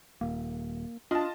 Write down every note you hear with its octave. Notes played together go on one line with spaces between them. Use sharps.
D#1 A#3
D4 F4 D#5 A5